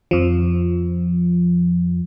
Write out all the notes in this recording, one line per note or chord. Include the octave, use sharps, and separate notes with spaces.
F2 F3